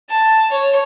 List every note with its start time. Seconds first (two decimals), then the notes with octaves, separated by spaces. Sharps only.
0.10 A5
0.51 C#5